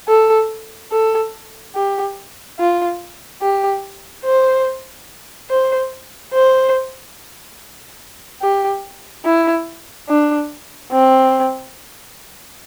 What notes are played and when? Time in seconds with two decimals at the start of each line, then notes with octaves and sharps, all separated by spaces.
0.08 A4
0.92 A4
1.75 G4
2.59 F4
3.41 G4
4.25 C5
5.50 C5
6.34 C5
8.42 G4
9.25 E4
10.09 D4
10.92 C4